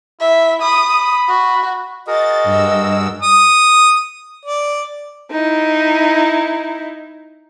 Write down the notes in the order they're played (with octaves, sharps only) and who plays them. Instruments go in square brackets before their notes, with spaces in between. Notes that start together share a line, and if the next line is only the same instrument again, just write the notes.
[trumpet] E4 [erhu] E5
[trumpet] B5 [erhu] D#6
[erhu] F#4
[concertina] F#4 G#4 A#4 [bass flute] D#5 [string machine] A6
[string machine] G2 E6
[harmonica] D#6
D5
[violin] D#4 E4